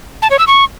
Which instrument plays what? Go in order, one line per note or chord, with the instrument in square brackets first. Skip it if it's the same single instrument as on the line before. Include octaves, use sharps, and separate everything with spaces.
[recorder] A5
C#5
E6
C#6